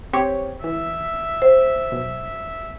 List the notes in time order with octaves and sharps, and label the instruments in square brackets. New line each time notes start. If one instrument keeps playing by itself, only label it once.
[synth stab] C4 G4 C#5
[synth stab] E3 [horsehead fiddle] E5
[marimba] C5
[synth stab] B1